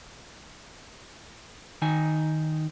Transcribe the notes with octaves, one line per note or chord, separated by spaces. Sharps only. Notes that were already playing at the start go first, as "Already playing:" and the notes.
D#3 D#4 G#5